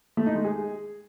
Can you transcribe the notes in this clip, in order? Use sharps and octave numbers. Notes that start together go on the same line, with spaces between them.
A3
D#4
G#3
G#4